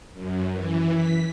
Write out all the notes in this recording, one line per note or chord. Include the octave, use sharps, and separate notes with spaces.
F#2
E3
B6